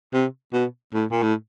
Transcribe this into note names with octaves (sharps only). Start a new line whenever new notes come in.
C3
B2
A2
A#2
A2